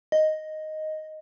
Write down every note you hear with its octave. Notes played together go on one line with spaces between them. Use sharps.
D#5